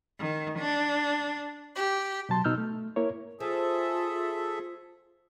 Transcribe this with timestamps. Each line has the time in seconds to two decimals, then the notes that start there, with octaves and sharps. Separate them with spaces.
0.19 D#3
0.59 D4
1.76 G4
2.29 B2 F#3 A5 C6
2.44 B2 D#4 E6 F6 G6
2.58 A3
2.96 A#3 E4 A#4 C#5
3.40 F3 F4 G#4 A4 E5